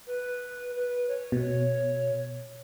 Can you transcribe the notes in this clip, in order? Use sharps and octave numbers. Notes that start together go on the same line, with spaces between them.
B4
B4
C#5
B2